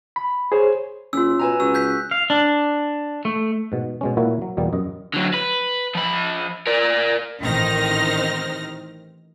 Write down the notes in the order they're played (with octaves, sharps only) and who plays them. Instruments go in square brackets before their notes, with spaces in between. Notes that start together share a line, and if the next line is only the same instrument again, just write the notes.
[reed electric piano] B5
G#4 C5 C#5
[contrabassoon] F#1 [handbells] C#4 F4 [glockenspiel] E6
[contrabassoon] B2 [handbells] B4 G#5 A#5
[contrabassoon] C#2 [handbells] F#4 [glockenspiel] E6
[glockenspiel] F#6 G6 B6
[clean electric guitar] F5
D4
A3
[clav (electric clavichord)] G#2 B2
B2 G#3 C#4
A#2 A#3 E4 F#4 C#5 E5
F#3
E2 B2 G3 A#3
F#2 D#5
[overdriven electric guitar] D3 F#3
B4
F3 B5
A#4 D5
[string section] A1 D#3 C4 D#4 F6 A#6